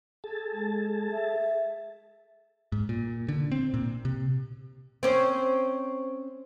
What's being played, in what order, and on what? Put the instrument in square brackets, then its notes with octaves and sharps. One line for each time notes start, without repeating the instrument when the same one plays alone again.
[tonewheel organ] G#4 A4 A5
[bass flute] G#3
E5
[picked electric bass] G#2
A#2
D3
C4
A#2
C3
[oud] C4 C#4 C5